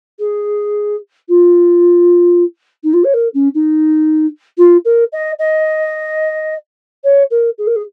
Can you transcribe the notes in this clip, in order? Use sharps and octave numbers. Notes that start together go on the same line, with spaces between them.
G#4
F4
D#4
F4
C#5
A#4
C#4
D#4
F4
A#4
D#5
D#5
C#5
A#4
G#4
A#4
G#4